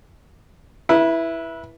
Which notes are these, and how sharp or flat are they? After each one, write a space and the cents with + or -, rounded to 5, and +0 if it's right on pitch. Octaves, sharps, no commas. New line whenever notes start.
E4 +0 B4 -25